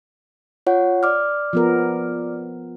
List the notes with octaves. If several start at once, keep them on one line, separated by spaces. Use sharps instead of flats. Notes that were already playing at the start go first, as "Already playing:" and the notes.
F4 C#5 F#5
D5 D6 F6
F3 B3 A#4